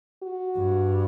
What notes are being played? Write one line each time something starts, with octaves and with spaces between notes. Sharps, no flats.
F#4
G2